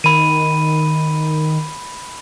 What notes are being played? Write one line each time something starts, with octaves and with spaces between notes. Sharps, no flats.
D#3 B5 D#7